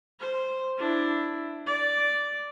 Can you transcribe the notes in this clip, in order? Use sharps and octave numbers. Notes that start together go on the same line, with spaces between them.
C5
D4 E4
D5